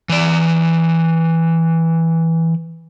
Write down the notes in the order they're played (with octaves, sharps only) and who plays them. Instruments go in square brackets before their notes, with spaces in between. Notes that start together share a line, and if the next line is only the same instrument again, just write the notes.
[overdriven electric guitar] E3 D5